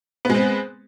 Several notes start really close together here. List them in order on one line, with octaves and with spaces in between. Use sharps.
B3 G#3 C4